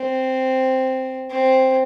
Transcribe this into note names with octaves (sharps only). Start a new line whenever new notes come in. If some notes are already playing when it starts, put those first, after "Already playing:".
Already playing: C4
C4